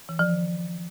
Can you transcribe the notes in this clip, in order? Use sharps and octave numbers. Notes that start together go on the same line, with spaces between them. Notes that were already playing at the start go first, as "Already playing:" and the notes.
E3
F3
D#3